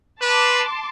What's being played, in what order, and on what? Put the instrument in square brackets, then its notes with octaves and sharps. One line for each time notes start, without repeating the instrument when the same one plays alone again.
[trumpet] B4 [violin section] A5 C6 D6